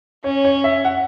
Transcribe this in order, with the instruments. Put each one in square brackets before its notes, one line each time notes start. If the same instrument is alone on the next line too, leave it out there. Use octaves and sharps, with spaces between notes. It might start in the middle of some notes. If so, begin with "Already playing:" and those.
[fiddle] C#4 [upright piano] C#5
[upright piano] C#5
E5
F#5